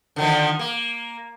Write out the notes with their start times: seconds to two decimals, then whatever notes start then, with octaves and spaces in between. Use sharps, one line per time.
0.16 D3 D#3 F3
0.59 A#3